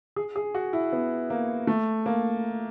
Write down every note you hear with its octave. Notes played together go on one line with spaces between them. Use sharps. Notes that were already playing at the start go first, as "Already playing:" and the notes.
G#4
G#4
F#4
E4
B3
A#3
A3
A#3